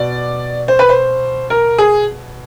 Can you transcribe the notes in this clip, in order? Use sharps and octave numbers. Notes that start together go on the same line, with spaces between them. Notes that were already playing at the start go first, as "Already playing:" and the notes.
Already playing: B2 D5
C5
B4
C5
A#4
G#4